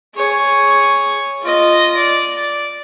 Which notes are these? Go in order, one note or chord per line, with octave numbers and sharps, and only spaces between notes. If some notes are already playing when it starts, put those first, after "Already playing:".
G#4 C#5
F4 D#5
D5